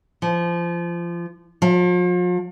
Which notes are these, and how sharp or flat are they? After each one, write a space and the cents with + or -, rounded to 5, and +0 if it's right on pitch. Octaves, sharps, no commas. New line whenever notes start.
F3 -25
F3 +40